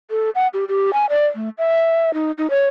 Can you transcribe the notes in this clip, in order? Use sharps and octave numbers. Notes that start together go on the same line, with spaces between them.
A4
F#5
G4
G4
G#5
D5
A3
E5
D#4
D#4
C#5